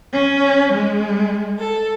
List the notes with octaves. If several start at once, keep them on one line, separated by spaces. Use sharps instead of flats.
C#4
G#3
A4